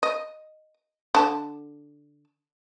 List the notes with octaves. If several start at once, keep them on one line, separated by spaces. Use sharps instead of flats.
D#5
D3 A5